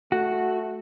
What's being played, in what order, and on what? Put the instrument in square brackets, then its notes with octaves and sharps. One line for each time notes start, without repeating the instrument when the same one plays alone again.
[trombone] A3 [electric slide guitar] F#4